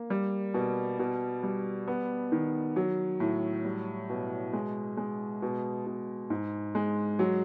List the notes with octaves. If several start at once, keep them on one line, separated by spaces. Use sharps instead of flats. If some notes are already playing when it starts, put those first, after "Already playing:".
Already playing: A#3
G3
B2
B2
G3
B3
D#3
F#3
A2
G3
B2
G#3
G#3
B2
B2
G#2
G#3
F#3